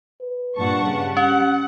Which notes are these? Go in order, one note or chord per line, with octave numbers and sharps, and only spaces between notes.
B4
G2 A#2 F#5 A5 C#6
C#3 G3
C#4 G4 F#5